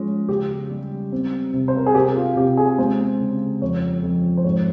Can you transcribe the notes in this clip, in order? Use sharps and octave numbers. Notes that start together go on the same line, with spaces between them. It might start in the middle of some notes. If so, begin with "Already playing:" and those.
Already playing: F3 G#3 C#4
C#3 G4
G3
C4
C3
C5
A#4
G#4
C3 G4
F4
C3 G4
G#4
G#3 C5
C#3
F2 C#5
F2
C5
G#2 C#5